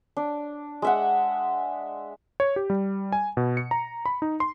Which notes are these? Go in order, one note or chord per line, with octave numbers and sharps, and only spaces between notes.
D4
G#3 E5 F#5
C#5
G4
G3
G#5
B2
C#7
A#5
B5
D#4
C6